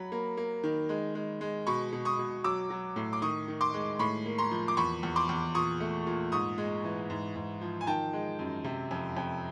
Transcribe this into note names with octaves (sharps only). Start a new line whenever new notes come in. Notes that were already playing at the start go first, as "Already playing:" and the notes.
Already playing: F#3 B5
A#3
A#3
D#3
G#3
G#3
G#3
B2 B5 C#6
B2
C#6 D#6
B2
F#3 D6 E6
F#3
A2
D6
D#3 C#6 D#6
D#3
C6 D6
G#3
A2 B5 C#6
A#3
A#5 C6
F3
D6
E2 B5 C#6
E2
C6 D6
E2
A#2 C#6 D#6
A3
A#2
G#2 C#6 D#6
G#3
E3
G#2
G#2
F3
G#5
D#3 G5 A5
G#3
F#2
C3
F2
F2